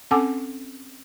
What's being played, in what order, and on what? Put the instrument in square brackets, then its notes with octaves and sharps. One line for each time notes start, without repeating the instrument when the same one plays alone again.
[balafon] C4 C#4 A4 F#5 G#5 D6